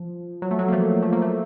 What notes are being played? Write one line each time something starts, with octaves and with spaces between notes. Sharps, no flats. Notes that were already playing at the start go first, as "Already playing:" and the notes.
Already playing: F3
F#3
A3
F#3
A#3
F3 A3
F3 A3
A#3
A3